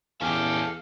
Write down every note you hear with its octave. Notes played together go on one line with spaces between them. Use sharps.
E2 C#4 G4 A4 F5